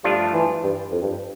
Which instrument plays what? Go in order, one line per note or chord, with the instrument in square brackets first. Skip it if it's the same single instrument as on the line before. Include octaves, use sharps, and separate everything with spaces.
[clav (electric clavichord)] G2 F3 A3 D4 F4 [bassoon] G3
[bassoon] E3
G2
F2
G2